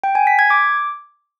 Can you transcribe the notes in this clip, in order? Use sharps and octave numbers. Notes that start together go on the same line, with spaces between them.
G5
G#5
B6
G#6
D6